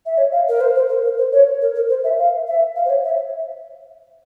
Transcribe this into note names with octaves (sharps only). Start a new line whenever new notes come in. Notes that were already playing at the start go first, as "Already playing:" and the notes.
E5
C#5
F5
A#4
C5
C5
A#4
A#4
C5
C#5
A#4
A#4
C5
E5
F5
E5
F5
C5
C#5
E5